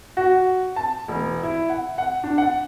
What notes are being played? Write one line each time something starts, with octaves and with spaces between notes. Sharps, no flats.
F#4
A5
E1
E4
F#5
F#5
D4
F#5